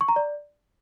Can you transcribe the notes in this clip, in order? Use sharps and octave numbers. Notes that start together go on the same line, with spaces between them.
C#6
A#5
D5